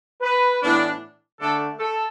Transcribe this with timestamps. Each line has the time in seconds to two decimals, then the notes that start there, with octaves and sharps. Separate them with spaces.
0.21 B4
0.61 A2 E3 B3 D4
1.41 D3 A3 D4 A4
1.80 A4